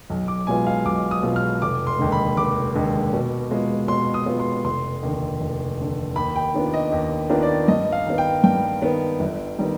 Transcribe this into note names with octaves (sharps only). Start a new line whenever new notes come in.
B1
D6
B2 G#3 B3 F4 G#5
F5
B1 D6
D#6
B2 G#3 B3 F4
F6
F1 D6
C6
D#2 D3 G#3
B5
F1 D6
D#2 D3 G#3
B2
G#3 B3 F4
B2 C6
D#6
G#3 B3 F4
C6
F1 C6
D#2 D3
F1
D#2 D3
D#2 B5
G5
D#3 B3 D4 F4
D#5
D#2
D#3 B3 D4 F4
D5
G2 D#5
F5
D#3 B3
G5
G2 G5
D#3 B3
G1
D#3 G3 B3